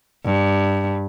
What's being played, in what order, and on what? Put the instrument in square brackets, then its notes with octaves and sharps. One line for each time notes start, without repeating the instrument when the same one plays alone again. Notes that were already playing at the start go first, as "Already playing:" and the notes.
[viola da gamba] G2